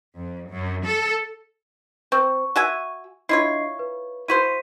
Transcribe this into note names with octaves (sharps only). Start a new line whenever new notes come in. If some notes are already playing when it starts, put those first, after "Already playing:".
F2
F#2
A4
C4 C#6
F#4 E5 G#5
D4 E4 F4 C#5 D#5 C7
B4
E4 F#4 C5 B6 D#7